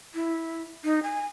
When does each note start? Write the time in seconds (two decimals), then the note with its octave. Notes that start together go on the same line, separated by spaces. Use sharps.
0.15 E4
0.84 D#4
1.03 G#5